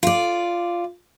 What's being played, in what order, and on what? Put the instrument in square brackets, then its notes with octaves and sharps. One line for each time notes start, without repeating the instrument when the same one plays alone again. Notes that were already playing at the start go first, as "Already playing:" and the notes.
[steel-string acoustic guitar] F4 D5